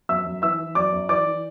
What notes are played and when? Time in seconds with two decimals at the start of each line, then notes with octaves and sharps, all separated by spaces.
0.09 F#2 E5 E6
0.26 F#2
0.42 E3 E5 E6
0.59 E3
0.75 F#2 D5 D6
0.92 F#2
1.09 E3 D5 D6
1.25 E3